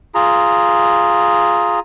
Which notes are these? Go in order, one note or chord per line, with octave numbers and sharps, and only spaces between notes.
F4 G#4 A#5